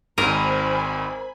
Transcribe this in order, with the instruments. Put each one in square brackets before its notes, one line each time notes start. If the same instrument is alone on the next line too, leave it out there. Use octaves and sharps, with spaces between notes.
[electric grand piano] G#1 G#2 D#7 [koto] A#4 [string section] C5 G#5 B5